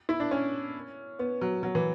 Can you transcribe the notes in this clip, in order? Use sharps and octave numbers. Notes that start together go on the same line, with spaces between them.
E4
D4
C#4
B3
F#3
F#3
E3